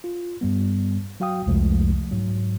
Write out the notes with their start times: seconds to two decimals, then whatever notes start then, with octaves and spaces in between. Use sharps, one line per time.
0.04 F4
0.41 G2 G3 B3
1.20 F#3 F#4 F5 G5 D#6
1.46 C2 F2 C3 F3 G#3 A3
2.11 G#2 F#3